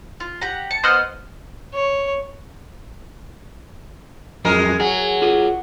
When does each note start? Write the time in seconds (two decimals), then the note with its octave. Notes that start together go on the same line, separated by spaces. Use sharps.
0.20 F4
0.41 G4 F#5 A#5
0.71 A5 C#7
0.84 B3 C5 D#5 F#5 F6
1.74 C#5
4.45 F2 F#3 G#3 A#4
4.80 F#3 G#4
5.22 F4 G#4